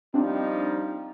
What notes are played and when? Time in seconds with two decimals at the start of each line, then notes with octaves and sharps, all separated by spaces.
0.14 F3 G3 C4 D4 D#4